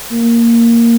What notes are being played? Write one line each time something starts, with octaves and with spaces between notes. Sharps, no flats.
A#3